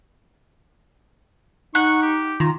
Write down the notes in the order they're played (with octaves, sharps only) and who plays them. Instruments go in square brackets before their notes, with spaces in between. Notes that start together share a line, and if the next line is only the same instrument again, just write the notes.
[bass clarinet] D#4 [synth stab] F#5 [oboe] C#6 [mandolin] F#6
[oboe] G4
[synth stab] D#3 A#5 [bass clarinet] F4